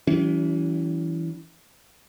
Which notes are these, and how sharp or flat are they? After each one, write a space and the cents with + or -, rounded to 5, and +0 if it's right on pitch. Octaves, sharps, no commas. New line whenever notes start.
E3 +0 G3 -40 C#4 +35